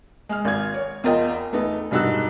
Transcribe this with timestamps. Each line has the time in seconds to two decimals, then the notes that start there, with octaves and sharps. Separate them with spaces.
0.29 G#3 F6
0.45 G#1 G#6
0.74 C#5
1.04 E2 F4 A#4 D#5 G5
1.52 E2 A3 B3 D#4
1.91 E1 G2 D#4 F#4 E6 F#6